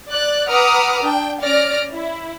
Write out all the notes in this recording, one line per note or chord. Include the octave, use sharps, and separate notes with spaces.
D5 F#6
B4 F#5 A#5 D6 D#6 F6
D4 G5
C#4 D5 F6 A#6 D7
E4